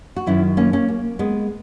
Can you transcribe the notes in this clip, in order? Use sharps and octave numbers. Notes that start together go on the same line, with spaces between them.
F#4
F#2 D#3 F#3 C#4 E4
A#3 C#4
A#3 C#4
A#3
G#3 B3